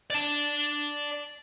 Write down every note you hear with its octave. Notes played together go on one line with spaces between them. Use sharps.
D5 A5